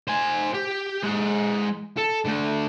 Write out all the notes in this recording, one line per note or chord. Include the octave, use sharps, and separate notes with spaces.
C5 G#5
G4
G#3 F#5
A4
D3 A3